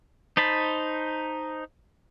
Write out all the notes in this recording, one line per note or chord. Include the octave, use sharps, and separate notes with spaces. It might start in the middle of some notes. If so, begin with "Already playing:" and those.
D#4 C5 A5 B5